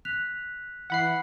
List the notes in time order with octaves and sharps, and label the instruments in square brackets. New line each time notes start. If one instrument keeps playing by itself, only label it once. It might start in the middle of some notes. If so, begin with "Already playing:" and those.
[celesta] F#6 B6 F7
[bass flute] E3 [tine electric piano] F#5 B5 C7